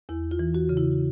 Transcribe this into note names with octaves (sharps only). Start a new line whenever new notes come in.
E2 E4
F4
E3
F#4
C#3
E4